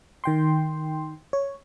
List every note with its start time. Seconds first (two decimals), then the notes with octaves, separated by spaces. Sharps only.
0.24 D#3 G5 C6
1.33 C#5